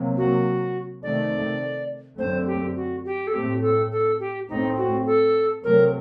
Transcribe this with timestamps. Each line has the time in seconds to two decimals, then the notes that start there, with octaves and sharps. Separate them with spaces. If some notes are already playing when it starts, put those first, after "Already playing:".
Already playing: C3 F#3 A#3
0.17 F#4
1.02 C3 D#3 A3 D5
2.18 F#2 D3 A3 C4 C5
2.46 G4
2.75 F#4
3.05 G4
3.27 A4
3.33 A2 A3 C4 G4
3.62 A4
3.91 A4
4.19 G4
4.48 A2 A3 C4 D#4
4.77 F#4
5.05 A4
5.63 C3 F#3 A3 A#4